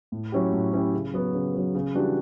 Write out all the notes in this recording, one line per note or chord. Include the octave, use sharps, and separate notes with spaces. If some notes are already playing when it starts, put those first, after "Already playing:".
A2
F#3 C#4 E4 G4
A2
F#3 C#4 E4 G4
C#3
F#3 B3
C#3
F#3 B3
C#3
E3 G3 D4 F#4